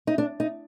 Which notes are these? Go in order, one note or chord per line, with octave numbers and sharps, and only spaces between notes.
D#4
D4
D#4